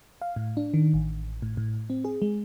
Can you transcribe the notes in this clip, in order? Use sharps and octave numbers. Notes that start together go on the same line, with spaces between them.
F5
A2
D4
D#3
A1
A2
A2
C4
G#4
G#3